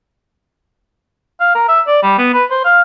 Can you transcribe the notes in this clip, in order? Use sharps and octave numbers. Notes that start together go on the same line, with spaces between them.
F5
A#4
E5
D5
G3
B3
B4
C5
F5